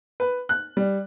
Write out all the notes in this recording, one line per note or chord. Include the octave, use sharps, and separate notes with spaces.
B4
F#6
G3